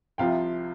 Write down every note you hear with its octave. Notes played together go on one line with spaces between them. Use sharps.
C2 C3 F3 F5 G5